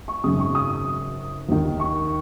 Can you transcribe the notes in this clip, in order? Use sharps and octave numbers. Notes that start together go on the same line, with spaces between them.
C#6
G#1 F#2 C#3 D#6
C#6
D#6
D#2 D#3
C#6